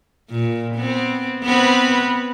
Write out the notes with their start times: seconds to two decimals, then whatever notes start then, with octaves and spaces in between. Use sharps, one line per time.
0.30 A#2
0.76 B3 C4
1.44 B3 C4 B4